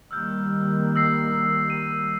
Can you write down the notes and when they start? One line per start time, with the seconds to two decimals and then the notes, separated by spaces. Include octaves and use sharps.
0.11 D#3 G3 A#3 E6 F6 G6
0.96 E6 A#6 C7
1.70 D#7